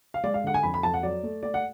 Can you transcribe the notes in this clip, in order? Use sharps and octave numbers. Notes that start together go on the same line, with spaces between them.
F5
G#3 D5
F5
D3 F#5
G#5
F2 B5
B5
F2 A5
F#5
F#3 D5
A3
A3 D5
F#5